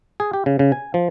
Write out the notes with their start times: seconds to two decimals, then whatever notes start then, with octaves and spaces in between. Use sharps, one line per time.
0.20 G#4
0.33 G4
0.46 C#3
0.59 C#3
0.72 G#5
0.94 F3